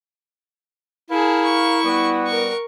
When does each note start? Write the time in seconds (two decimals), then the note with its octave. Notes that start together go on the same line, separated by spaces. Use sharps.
1.11 E4 G#4 A#4 F5 A5
1.44 C#6
1.85 G3 B3 F#4
2.27 A#4 C#6